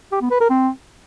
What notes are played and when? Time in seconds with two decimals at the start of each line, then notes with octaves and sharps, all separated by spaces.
0.12 G4
0.21 B3
0.31 B4
0.40 A#4
0.50 C4